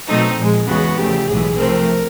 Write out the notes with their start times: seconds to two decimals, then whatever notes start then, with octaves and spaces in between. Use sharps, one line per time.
0.08 B2 F#3 A3 C4 D#4
0.38 A#2 F3 G#3
0.68 E2 C#3 E3 G#3 B3 F#4
0.98 E2 C#3 F3 A3 G4
1.28 B1 A2 E3 G#3 G#4
1.58 C3 F3 A3 C4 A#4